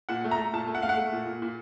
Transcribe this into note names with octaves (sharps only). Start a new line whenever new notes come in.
A#2 F#5
A3
A#5
A3
A#2 A5
A3
F#5
A3 F5
F#5
A3
A#2
A#2
A#2